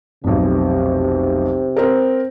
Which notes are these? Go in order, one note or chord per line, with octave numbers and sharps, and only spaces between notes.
F1 B1 C3
C4 A#4